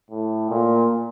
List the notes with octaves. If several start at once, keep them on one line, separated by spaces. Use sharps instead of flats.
A2
A#2